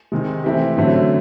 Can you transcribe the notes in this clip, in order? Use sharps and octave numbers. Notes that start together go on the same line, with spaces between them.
C3 D#3 G#3
E3 A3 C4 E4 G4
F#2 D3 F#3 A3 C4